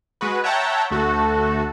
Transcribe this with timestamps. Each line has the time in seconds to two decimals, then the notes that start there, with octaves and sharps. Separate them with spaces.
0.21 G#3 F#4 B4
0.44 C#5 E5 F#5 G5 A5 A#5
0.91 D2 A3 F#4 A4